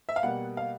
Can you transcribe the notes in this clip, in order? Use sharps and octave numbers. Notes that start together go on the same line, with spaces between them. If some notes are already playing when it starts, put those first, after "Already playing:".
E5
F5
B2 G3 A#3 F#5
F5